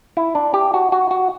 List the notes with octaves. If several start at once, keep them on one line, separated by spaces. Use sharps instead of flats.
E4
D4
G4
F#4
F#4
F#4